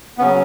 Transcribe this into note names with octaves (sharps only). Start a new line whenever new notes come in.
B3
C#3 F#3 C#4